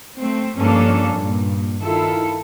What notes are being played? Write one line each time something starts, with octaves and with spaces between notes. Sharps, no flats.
A3 C4
G2 F3 A#3 C#4 D4 A4
G2 A#2
D#3 E4 F4 A4